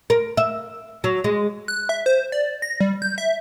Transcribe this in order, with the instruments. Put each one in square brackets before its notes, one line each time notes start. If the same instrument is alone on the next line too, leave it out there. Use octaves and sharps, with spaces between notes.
[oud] A#4
E5
F#3
G#3
[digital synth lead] F#6
E5
C5
D5
A#6
G3
G6
E5